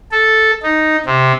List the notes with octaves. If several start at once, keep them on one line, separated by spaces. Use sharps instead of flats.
A4
D#4
C3